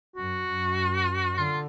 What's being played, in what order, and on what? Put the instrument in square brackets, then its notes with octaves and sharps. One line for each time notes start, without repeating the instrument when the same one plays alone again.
[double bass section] F#2 [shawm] F#4
[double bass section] F#2
[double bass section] D3 [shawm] F4